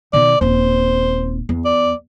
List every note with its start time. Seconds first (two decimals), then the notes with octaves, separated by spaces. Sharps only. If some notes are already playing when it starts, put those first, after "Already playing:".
0.13 B2 D#3 D5
0.41 D#1 C4 C5
1.49 E2
1.65 D5